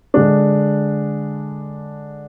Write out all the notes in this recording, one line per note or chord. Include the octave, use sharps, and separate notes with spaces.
D3 G#3 D4